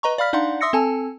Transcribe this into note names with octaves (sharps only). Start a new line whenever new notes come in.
B4 D#5 A#5 C#6
D5 F5 B5 F6 B6
D4 D#4 D5 F5 F#5 C6
E5 C6 D#6 E6 A#6 C#7
C4 A4 G#5 A5